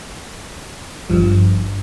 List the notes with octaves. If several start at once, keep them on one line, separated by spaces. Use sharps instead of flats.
G#1 G2 F3